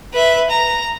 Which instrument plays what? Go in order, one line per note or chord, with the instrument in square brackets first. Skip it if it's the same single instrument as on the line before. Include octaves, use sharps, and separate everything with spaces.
[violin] B4 E5
A#5